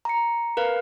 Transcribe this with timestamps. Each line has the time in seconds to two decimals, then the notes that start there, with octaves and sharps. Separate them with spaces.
0.05 A#5 C#7
0.57 A#4 B4 F5